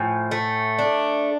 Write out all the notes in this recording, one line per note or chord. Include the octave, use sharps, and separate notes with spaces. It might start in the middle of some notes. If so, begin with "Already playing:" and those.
Already playing: A2 F3 G#5
A3
D4